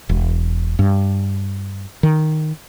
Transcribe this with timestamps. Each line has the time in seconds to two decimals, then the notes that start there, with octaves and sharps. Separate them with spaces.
0.09 E1
0.79 G2
2.03 D#3